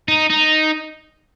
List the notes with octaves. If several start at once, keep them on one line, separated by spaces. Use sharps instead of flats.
D#4
D#4